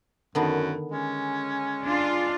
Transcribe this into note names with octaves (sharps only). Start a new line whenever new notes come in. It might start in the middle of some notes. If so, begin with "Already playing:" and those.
F#2 D3 D#3 B3
G#3 C#4
D4 F4